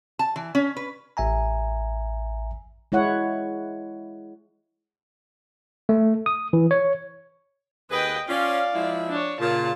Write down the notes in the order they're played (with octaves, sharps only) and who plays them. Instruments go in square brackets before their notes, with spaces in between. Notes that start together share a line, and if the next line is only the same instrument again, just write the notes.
[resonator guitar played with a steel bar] A5
E3
C#4
B4
[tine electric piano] A1 E5 G#5 A#5
[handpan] G#3 E4 C#5 F#5
[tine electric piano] A3
D#6
E3
C#5
[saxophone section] D#2 G#4 B4 [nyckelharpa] D#5 G5
[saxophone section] C#4 F4 [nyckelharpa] D5 F5
[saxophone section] F3 G#3 E4
[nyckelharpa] D4 C#5
[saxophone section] A#2 C#3 [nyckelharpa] F4 A5